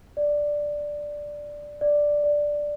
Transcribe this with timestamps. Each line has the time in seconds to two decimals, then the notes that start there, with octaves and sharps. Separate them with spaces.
0.17 D5
1.81 D5
2.24 D5